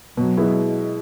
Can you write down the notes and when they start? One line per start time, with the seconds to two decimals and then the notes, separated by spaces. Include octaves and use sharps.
0.17 B2 F#3
0.37 G#3 B3 E4